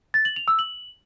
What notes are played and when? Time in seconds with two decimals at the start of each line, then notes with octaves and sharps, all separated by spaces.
0.14 A6
0.25 F#7
0.36 F7
0.48 E6
0.59 F#7